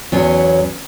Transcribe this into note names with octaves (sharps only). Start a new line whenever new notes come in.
E2 F#3 C#4